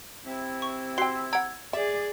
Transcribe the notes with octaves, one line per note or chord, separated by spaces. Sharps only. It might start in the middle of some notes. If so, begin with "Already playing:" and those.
C3 C4 E4
C#6
F#4 G5 C6 C7
F#5 A#5 E6 G#6 D7
G#4 D5 E5